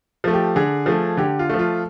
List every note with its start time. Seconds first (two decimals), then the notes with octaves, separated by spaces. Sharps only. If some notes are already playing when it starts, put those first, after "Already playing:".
0.24 F3 A3
0.34 G4
0.56 D3 G#4
0.86 F3 A3
1.17 D3 G4
1.39 F4
1.49 F3 A3
1.59 F4